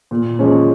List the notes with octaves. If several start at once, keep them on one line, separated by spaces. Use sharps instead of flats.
A#2
F3 G#3 C#4